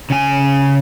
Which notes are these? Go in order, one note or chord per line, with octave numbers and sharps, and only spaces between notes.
C#3 G#5